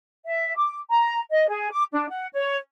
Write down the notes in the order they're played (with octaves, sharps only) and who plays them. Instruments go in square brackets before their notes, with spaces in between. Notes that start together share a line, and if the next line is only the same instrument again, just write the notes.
[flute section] E5
D6
A#5
D#5
G#4
D6
D4
F#5
C#5